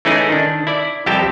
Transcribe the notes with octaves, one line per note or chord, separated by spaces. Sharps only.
E3 A3 C#4 D#4 E4 G#4
D#3 D4
E4 D5
C2 F2 C3 G4 G5 A5